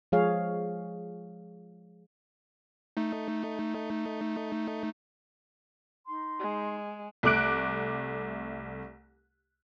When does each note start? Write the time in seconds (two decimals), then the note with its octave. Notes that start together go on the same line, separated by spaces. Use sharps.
0.12 F3 G#3 G#4 C#5 F5
2.97 A3 D#4
6.05 D#4 C6
6.40 G#3
7.23 C2 A3 D6 F#6 D7